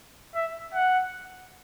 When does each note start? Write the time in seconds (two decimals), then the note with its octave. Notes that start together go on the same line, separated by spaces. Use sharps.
0.35 E5
0.74 F#5